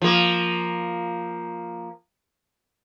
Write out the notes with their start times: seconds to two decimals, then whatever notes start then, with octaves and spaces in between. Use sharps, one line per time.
0.02 F3 A#3